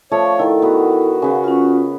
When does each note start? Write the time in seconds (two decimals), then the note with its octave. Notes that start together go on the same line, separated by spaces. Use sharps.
0.12 F3 A3 C#5 D5
0.39 D#3 E4 A4
0.62 B3 F#4 A#5
1.22 C#3 B3
1.44 C#4 F4